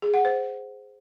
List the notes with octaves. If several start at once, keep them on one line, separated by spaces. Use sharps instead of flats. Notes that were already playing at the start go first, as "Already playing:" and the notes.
G#4
F#5
C5